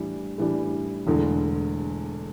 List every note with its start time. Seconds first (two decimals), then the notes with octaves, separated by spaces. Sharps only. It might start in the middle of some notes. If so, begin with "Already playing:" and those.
Already playing: A2 E3 G3 D4
0.38 A2 E3 G3 D4
1.07 E1 E2 D3 A3